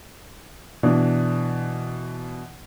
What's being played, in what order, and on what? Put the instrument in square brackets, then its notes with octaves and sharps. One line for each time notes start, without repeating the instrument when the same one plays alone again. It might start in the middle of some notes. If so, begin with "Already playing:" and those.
[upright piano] B2 E3 D4